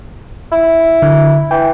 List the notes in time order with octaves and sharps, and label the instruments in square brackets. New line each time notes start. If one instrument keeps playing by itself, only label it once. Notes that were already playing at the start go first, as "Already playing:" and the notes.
[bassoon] E4
[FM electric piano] D3
[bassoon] E3 [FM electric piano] G5